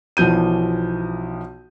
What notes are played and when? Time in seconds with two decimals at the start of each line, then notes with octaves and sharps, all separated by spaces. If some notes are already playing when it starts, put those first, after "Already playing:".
0.17 B1 E3 F3 G6 D#7